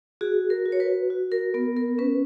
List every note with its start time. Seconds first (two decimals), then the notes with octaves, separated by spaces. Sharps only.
0.21 F#4 G#4
0.50 A#4
0.66 F#4
0.72 C#5
0.80 B4
1.10 F#4
1.32 A#4
1.54 B3 A#4
1.77 A#4
1.98 C#4 B4